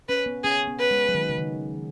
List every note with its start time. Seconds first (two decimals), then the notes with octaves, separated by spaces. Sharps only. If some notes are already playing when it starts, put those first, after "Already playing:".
0.09 C#4 B4
0.26 B3
0.44 C#4 G#4
0.68 B3
0.79 B4
0.91 G#3
1.09 F#3
1.15 D#3
1.29 C#3
1.38 D#3